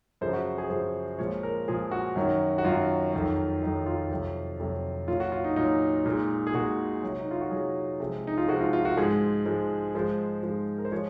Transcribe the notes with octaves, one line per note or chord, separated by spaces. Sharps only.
F#2 C#3 F3 C5
F#4
G#4
F#2 C#3 F3 C5
A#2 F3 G#3 C#5
A#4
A#2 F3 G#3 G#4
F#4
F#2 D#3 F#3
F#4
F#2 D#3 F#3 F4
F2 D#3 F#3
F2 D#3 F#3 D#4
F4
F2 C3 F#3
F2 C3 F#3
A#2 F#3 F4
F#4
F4
D#4
A#2 F#3 D#4
A#2 G#3
G#4
A#2 G#3 F#4
C3 F#3
D#4
F4
F#4
F#3 G#4
C3
C3 F3 G#3
D#4
F4
C3 F3 G#3 F#4
D#4
F4
F4
F#4
G#2 F3 G#3 G#4
G#2 F3 G#3
G#2 F3 G#3 C5
G#2 F3 G#3
A#4
C5
F3 G#3 C#5